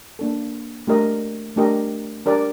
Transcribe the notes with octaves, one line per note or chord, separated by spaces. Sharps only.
A#3 D4 A4
A3 D4 G4 A#4 D#5
A3 D4 G4 A#4 D#5
D4 G4 A#4 D5